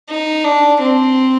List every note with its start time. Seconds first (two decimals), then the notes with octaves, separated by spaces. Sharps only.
0.09 D#4
0.44 D4
0.80 C4